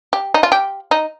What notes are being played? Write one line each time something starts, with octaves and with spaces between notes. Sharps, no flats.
G4
D#4
F4
G4
D#4